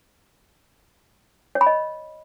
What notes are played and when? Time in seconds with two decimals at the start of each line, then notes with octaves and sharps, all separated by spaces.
1.55 C#5
1.61 B5
1.67 D#5